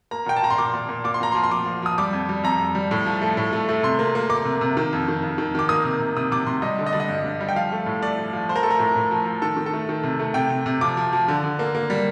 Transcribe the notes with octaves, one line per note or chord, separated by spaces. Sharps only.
A#3 A#5
A#2 G5
A5
A#2 A#5
C6
A#2 D6
A#2
A#2
A#2 D6
C6
A#2 A#5
C6
F3
C6
F3 D6
F3
F3 D#6
G3 D6
F2
G3
F2 A#5
F2
G3
A2
F3
A3
A2
A3
A3
C3 C6
A#3
A#3
A#3 D6
C3
C3
D#3
F2
D#3
F2
D#3
D#3 D6
A#3 D#6
C3
C3
C3 D#6
C3 D6
C3 C6
G3 D#5
D3
D#5
G3 D5
D#5
G2
G2
G3
G5
F3 F5
A3
A2
A3 D5
F3
F3
F3 C5
A#4
A3 A4
A#4
A2
A2
F3
F3
D#3 A4
D#3
A4
A3
D#3
C3
A3
C3 G5
C3
C3
F3 D6
F3
F3
D3
D3
A#3
A#3
G3